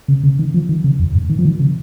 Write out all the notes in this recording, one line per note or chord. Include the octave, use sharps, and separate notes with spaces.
C#3
C#3
D#3
F3
D#3
C#3
F2
G#2
D#3
F3
D#3
C#3